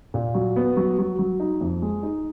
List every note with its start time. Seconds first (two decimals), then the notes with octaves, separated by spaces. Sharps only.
0.14 A#2
0.34 F#3
0.56 B3
0.77 F#3
0.98 F#3
1.19 F#3
1.40 D#4
1.61 F2
1.82 G#3
2.03 D#4